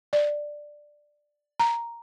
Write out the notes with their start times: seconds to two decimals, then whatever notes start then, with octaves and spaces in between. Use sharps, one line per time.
0.13 D5
1.60 A#5